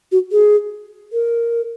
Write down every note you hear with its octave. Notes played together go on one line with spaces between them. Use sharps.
F#4
G#4
A#4